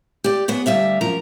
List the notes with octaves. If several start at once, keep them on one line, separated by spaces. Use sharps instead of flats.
G4 D5
F#3 G#3 B3
D2 G3 E5 F5
F#2 F3 A#4 A#5